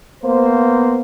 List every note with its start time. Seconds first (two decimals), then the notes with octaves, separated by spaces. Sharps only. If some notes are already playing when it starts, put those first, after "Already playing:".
0.23 A#3 B3 C5